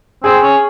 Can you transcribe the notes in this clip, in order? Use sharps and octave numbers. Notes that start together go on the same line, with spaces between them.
C4 G#4
C#4